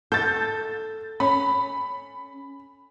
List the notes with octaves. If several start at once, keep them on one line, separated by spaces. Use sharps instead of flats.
A4 G6 A6
C#4 B5